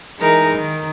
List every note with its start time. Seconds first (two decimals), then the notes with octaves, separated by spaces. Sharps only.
0.19 E3 G#3 D#4 A#4
0.56 D#3